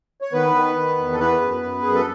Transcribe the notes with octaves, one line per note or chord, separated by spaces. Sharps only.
C#5
D#3 B3 B4
D#3
D#3
E2
A4
E3 B3 B4
F#2
F#2
F#2 G#4
A4